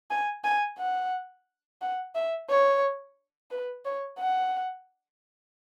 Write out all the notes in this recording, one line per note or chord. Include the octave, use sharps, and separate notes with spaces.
G#5
G#5
F#5
F#5
E5
C#5
B4
C#5
F#5